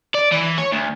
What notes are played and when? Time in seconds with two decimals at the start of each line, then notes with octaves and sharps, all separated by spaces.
0.14 D5
0.32 E3
0.58 C#5
0.73 D2